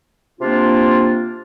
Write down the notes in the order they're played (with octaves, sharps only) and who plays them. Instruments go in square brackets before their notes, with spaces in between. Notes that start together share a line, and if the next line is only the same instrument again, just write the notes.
[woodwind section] C3 A#3 D4 F4